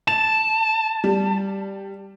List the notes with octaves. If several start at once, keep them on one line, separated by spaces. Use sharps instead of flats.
A5 E7
G3